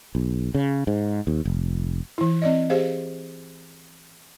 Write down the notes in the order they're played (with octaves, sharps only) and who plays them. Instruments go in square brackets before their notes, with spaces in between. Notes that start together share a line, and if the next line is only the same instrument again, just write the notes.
[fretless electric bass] B1
C#3
G#2
D#2
F1
[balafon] E3 E4
C4 D5 D#5
G4 G#4 C5 F5